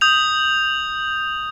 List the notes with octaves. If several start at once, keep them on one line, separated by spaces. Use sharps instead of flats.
D#6 G6 F7